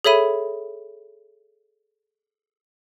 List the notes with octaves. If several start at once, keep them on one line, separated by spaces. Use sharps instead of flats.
G#4 A4 C#5 E5 B5 D#7